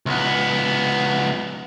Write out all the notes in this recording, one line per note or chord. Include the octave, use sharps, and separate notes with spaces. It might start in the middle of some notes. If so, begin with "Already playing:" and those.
C#2 B3